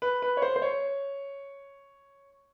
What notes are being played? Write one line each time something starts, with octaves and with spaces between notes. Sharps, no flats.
B4
B4
C#5
C5
C5
C#5